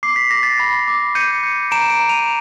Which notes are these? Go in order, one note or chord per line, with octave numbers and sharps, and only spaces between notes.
D6 C7
B6
D6 A#6
A6 B6
B5
D6
G6 C#7 D#7
G6
A#5 D7 E7
D7 E7
A#5
D#7 F7